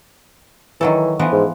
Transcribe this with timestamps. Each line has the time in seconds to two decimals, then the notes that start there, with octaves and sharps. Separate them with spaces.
0.81 D#3 E3 F#3 A4
1.19 E3 F3 B3
1.32 G#2